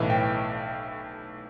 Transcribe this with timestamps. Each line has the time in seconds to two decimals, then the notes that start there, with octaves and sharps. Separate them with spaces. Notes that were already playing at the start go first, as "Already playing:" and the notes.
Already playing: B1 A2 E3
0.10 G5